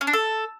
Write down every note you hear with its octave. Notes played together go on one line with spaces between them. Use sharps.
C#4
D4
A4